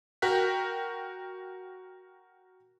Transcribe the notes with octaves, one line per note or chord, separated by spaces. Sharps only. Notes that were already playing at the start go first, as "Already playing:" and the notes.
F#4 A#4 G5 F#6 B6